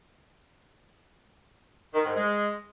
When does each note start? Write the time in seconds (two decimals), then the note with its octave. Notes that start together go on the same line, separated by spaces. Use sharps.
1.94 D#3
2.05 G#2
2.16 G#3